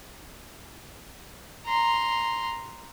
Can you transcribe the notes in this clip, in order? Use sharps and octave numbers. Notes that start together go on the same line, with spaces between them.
A#5 C6